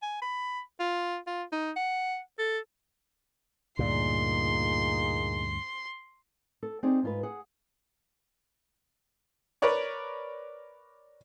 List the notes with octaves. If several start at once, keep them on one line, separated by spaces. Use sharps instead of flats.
G#5
B5
F4
F4
D#4
F#5
A4
D2 G2 A#2 A#3 D#4 G#4 C6
A4
C4 D#4 G#4 D5
G#2 F4 B4
G#4 F#5
A#4 B4 C#5 D5 C#6